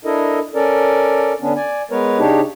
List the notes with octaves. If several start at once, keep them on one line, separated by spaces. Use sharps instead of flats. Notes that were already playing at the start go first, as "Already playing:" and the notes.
D4 E4 A4 A#4 D#5
C#4 A4 A#4 D5
D3 B3 C#4 D4
D5 G#5
G#3 B3 A#4 B4 C#5
C#3 D4 D#4 G4 C#5